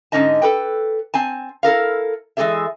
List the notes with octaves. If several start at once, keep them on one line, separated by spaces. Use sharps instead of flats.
G#2 D3 C#4 D#4 D#5 A5
A4 B4 G5
C4 G#5 A5
E4 A4 A#4 F5
E3 G#3 D#4 G#4 A4 E5